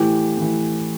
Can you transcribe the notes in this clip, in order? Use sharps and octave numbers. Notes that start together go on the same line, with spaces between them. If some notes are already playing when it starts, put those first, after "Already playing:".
Already playing: A2 E3 G4
A2 E3